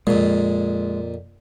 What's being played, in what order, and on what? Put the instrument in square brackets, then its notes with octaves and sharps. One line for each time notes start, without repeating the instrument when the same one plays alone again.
[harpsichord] F2 A#2 [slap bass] G#3